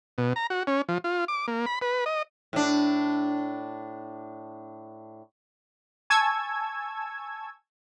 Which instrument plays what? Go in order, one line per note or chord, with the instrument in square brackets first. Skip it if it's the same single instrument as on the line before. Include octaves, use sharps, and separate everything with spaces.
[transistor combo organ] B2
A#5
F#4
C#4
F3
F4
D6
A#3
B5
B4
D#5
[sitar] A2 D4
[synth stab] G#5 A5 C#6 E6 G#6